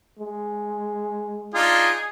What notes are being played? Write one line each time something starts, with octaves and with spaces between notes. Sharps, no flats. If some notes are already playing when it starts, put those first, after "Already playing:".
G#3
D4 D#4 F4 G#4